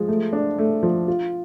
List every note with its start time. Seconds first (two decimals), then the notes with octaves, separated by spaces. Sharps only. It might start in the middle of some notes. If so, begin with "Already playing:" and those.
Already playing: F3 G#3
0.08 A3
0.33 D4
0.59 A3
0.83 F3
1.08 F4